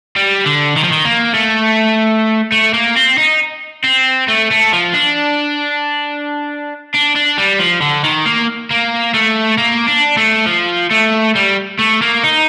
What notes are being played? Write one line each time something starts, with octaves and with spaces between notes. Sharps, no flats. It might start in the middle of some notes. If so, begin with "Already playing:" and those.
G3
D3
D#3
F3
D#3
A#3
A3
A3
A#3
C4
D#4
C4
A3
A3
F3
D4
D4
D4
G3
F3
D3
D#3
A#3
A#3
A3
A#3
D4
A3
F3
A3
G3
A3
A#3
D#4